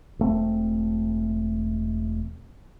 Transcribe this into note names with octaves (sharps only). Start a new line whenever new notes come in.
E1 A3 C4